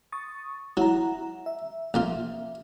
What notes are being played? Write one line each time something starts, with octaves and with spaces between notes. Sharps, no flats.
C#6 D#6 A6
F#3 E4 F#5 A#5
E5
A#1 A#3 F4